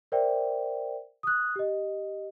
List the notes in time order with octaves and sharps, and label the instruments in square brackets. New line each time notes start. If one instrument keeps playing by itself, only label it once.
[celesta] A#4 C5 D5 E5 G5
D#6 F#6
G4 D#5